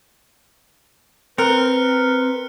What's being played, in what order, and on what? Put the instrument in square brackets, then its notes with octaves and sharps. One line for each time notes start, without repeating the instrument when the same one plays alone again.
[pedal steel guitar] C4 [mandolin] A#4 [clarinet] B4 [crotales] F6 F#6 C#7